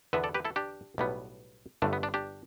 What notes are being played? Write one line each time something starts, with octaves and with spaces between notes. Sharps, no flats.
E2 D3 B3 B4 E5
A4 D5
G4 B4
E4 A4
D4 G4
B1 A2 G3 B3
G1 G2 D3 A3 D4
B3
D4
D4 G4